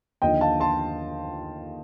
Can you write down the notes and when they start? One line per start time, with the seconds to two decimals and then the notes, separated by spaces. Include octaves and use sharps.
0.22 D#2 D3 F3 D#5 G5
0.41 F5 A5
0.60 A5 C6